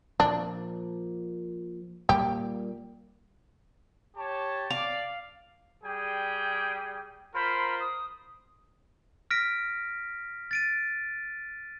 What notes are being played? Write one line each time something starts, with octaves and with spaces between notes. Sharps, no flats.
A#2 F3 D4
A#2 G3 A#3 G4
G4 C#5 A5
D5 F5
G3 G#4 G5
F4 A#4 C5 B5
D#6
F6 A#6 B6 D7
A6 D7 D#7